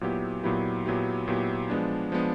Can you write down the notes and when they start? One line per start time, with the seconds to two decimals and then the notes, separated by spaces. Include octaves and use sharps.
0.01 A#2 F#3 B3 E4 G4
0.43 A#2 F#3 B3 E4 G4
0.86 A#2 F#3 B3 E4 G4
1.28 A#2 F#3 B3 E4 G4
1.70 F3 G#3 B3 D4
2.12 F3 G#3 B3 D4